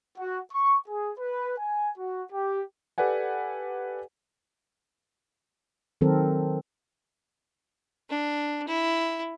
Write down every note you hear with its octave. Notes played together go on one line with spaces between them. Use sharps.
F#4
C#6
G#4
B4
G#5
F#4
G4
G4 A4 B4 D5 F#5 G#5
D#3 F#3 C4 A4 A#4
D4
E4